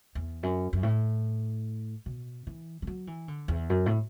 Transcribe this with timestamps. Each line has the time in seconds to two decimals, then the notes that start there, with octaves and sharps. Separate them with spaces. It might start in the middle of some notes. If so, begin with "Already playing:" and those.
0.15 E2
0.43 F#2
0.73 F#2
0.83 A2
2.06 B2
2.47 E3
2.82 E3
2.87 F#3
3.07 E3
3.28 D3
3.48 E2
3.70 F#2
3.86 A2